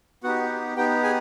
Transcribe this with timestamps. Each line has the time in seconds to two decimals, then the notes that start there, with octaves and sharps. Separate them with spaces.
0.24 B3 D#4 F#4 G4 F#5
0.77 B3 D#4 G4 G5
1.03 G#4 G#5